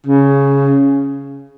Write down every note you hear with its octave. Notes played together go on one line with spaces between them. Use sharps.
C#3